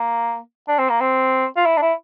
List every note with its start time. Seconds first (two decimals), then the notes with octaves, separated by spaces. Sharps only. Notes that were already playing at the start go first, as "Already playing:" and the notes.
Already playing: A#3
0.68 D4
0.79 C4
0.90 A#3
1.00 C4
1.56 F4
1.66 E4
1.77 D4
1.82 E4